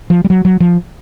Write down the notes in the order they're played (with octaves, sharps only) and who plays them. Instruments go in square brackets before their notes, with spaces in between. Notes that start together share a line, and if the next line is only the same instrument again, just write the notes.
[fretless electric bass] F3
G3
F#3
F#3
F3